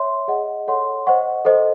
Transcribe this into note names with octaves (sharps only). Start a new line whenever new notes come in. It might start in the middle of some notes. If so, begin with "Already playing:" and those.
Already playing: C#5 E5 C6
G#4 D#5 F#5
A4 C#5 F#5 C6
C5 D#5 F#5 C#6
A4 C5 D#5